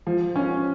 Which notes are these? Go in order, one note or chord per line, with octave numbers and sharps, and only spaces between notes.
F3
C#4